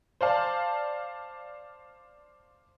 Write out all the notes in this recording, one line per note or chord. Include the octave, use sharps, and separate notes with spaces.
C5 D5 F5 A5